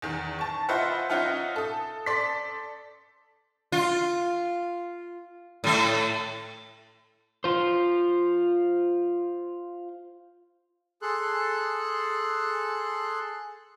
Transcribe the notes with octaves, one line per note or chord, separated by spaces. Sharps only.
E2 D#3
A5 C#6
F4 B4 C5 D#5 E5 F#5
C#4 D#4 F4 E5 F#5
A4 D#6
A4 D5 C6 B6
F4
A2 A3
F4 C5
G#4 A4 C6 F#6